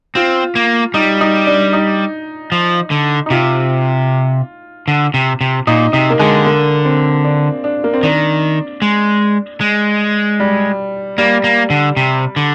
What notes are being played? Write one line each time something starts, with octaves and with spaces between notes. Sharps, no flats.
C4 F4
A#3
G3 D#4
D#4
D4
D#4
F3
D3
D#4
C3 F4
D3
C3
C3
A#2 D#4
C3 D#4
A#3
D3 G#3
A#3
C4
D4
D4
A#3
C4
D#3 D4
G#3
G#3
G3
G3 A#3
A#3
D3
C3
D3